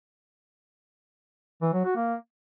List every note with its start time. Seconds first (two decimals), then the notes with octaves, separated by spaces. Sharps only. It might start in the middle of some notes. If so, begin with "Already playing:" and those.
1.62 E3
1.73 F#3
1.85 F#4
1.96 A#3